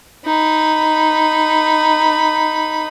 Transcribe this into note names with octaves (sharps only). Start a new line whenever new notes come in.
D#4 B5